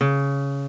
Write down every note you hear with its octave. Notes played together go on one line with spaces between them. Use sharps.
C#3